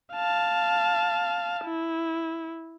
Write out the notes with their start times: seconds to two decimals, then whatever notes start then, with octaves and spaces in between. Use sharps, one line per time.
0.13 F5 A5
1.64 E4